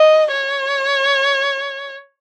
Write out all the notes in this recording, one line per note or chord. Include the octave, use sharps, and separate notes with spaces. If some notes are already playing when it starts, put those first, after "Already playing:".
Already playing: D#5
C#5